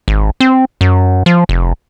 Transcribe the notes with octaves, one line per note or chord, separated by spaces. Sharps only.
G#1
C4
F#2
F3
F1